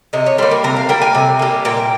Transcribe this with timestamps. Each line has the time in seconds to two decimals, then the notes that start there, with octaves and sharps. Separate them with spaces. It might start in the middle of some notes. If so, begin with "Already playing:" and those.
0.13 C3 D#5
0.26 C#5
0.38 G3 A#3 C5
0.51 A#4
0.64 C3 A#4
0.76 F5
0.89 G3 A#3 G5
1.02 G#5
1.15 C3
1.39 G3 A#3
1.65 A#2 G5